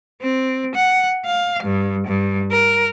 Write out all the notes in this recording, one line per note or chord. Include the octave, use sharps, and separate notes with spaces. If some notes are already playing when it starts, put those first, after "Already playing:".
C4
F#5
F5
G2
G2
A#4